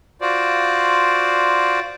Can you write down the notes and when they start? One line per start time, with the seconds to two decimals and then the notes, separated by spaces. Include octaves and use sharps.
0.21 F4 F#4 C5 D5